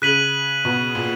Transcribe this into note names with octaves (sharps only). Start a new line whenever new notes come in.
C#3 F#6 B6 D#7 F#7
B2
A#2